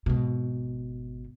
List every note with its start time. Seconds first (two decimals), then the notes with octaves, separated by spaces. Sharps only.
0.06 G#1 B2